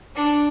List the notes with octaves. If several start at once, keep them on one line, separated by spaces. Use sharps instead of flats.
D4